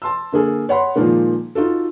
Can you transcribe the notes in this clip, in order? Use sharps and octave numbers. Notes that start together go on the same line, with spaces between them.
A5 C6 E6
D3 A#3 G#4 A4
C#5 F#5 B5 C6
A#2 D#3 F3 G#3 A#3
D#4 F4 F#4 A4